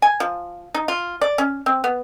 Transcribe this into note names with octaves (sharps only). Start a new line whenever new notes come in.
G#5
F3
D#4
F4
D5
C#4
C4
B3